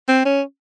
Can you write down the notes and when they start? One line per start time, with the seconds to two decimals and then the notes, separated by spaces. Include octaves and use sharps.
0.08 C4
0.25 C#4